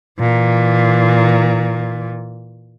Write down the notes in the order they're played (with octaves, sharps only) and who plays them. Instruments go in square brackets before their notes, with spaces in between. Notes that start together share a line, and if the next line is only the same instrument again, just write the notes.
[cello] A#2 E3